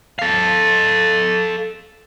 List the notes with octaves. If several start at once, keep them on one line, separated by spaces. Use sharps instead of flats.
A4 F5